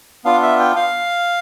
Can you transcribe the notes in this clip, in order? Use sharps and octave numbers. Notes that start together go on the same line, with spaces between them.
B3 D4 F4 F5
E5
G5
F5